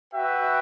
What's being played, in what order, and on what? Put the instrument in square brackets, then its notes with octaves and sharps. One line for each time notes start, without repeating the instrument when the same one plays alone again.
[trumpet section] F#4 B4 E5 G5